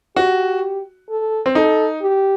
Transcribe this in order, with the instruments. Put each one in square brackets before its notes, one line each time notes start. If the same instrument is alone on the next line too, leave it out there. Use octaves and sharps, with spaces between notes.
[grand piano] F#4 [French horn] G4
[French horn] A4
[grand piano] C4
[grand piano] D#4 [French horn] A4
[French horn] G4